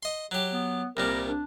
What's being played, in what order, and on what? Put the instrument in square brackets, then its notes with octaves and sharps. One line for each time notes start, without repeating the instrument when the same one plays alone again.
[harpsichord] D#5 C6
F#3 G4
[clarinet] B3
[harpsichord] C2 A#2 G3 [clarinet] A#4
[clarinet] D4